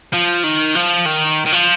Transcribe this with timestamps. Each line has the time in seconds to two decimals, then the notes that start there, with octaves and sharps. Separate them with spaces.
0.13 F3
0.44 D#3
0.75 F3
1.06 D#3
1.46 D#3
1.52 F3